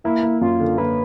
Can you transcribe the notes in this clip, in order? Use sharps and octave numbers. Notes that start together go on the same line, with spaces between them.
A#3 E4
A#3
F#2 F4
D3
A#3 B4